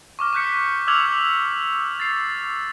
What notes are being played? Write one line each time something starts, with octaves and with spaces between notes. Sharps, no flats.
C#6 D6 F6
C#6 D6 F#6 G6 B6 C#7
D6 E6 F6 G#6 F7 F#7
A6 C7